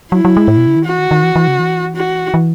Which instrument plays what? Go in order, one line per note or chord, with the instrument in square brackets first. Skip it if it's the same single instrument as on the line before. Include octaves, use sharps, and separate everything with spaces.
[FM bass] F#3 [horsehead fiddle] E4
[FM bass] F#3
G#3
A2
B2
C#3
D#3
[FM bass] E3 [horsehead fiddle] F#4
[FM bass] D#3
D#3
E3
E3
C#3
E3
[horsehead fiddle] F#4
[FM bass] E3